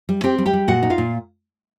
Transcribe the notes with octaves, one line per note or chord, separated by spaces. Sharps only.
G3
C4 G4 G5
G3
G4 G5
G3
A#2 F#4 F#5
D#4
F4 F5
A#2